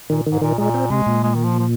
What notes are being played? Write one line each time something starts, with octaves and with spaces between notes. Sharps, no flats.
A#2 D#3
G#2 D#3
A#2 D#3
A#2 G#3
C4
C3 G#3
A#2
G#3
D#3
F3
F3